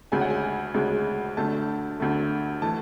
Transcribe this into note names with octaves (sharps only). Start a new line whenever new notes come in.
D2 C#3 G#3 G#5
F#5
G#5
D2 C#3 G#3
D2 D3 A3 A5
D2 D3 A3
E3 A3 A5